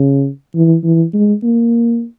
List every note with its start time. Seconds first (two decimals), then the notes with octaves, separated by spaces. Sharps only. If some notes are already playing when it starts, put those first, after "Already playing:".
Already playing: C#3
0.55 E3
0.84 E3
1.14 G#3
1.43 A#3